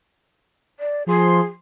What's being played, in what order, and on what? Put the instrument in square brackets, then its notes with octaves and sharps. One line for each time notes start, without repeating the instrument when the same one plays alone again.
[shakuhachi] D5
[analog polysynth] F3 C6 C7 [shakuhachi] G#4